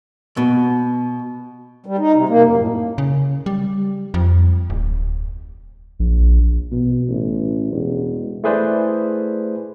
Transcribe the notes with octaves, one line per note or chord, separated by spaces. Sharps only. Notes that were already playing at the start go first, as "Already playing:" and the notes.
B2
G3
D#4
C3
A#3
F#2
A2
C#3
G3
F2
D1
A#1
B2
A1
E1
A3 E4 G#4 B4 C5 D5